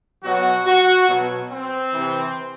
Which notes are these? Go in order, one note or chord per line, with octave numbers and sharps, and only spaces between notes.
B2 F#3 F#4
F#4
B2 F#3
C4
C3 E3